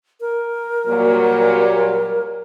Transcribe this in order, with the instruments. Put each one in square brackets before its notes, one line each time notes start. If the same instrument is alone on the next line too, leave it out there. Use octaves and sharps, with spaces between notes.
[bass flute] A#4
[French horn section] A#2 F#3 G3